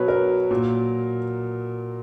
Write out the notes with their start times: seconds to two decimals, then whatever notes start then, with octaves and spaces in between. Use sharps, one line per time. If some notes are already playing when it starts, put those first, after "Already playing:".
Already playing: B2 F#3 B4 C#5
0.08 A#4
0.51 A#2 F#3